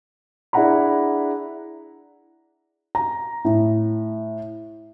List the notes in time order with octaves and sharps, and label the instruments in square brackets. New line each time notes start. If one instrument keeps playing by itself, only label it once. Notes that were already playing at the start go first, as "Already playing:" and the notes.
[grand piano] D4 E4 G#4 F#5 A#5 B5
[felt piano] A#5
A2